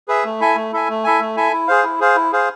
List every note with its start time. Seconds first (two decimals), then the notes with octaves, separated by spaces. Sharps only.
0.08 G#4 B4 E5
0.24 A3
0.40 E4 A4 E5 G#5
0.56 A3
0.72 E4 A4 E5 G#5
0.89 A3
1.04 E4 A4 E5 G#5
1.20 A3
1.37 E4 A4 E5 G#5
1.52 E4
1.68 G#4 C5 F5
1.84 E4
2.00 G#4 C5 F5
2.16 E4
2.33 G#4 C5 F5